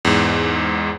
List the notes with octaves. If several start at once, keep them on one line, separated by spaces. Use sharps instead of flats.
E2 G#2